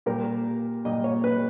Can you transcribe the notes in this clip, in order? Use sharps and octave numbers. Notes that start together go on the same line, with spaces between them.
A#2 G3 A#4
A#2 G3 D#5
C#5
B4